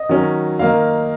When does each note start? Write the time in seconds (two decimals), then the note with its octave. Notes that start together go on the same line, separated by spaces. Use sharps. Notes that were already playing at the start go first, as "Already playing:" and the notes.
Already playing: D#5
0.09 D#3 F#3 C#4
0.59 D#3 A#3 D#4 F5